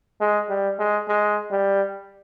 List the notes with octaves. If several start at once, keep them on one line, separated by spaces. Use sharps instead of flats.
G#3
G3
G#3
G#3
G3